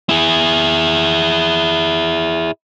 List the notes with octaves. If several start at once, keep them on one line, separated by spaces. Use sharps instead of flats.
E4 G#4